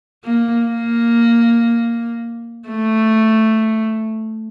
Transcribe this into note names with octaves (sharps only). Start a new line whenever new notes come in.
A#3
A#3
A3